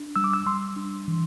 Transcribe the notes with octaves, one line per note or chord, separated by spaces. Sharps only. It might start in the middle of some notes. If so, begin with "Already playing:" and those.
Already playing: D4
G3 E6
D6
E6
G3 C6
D4
E3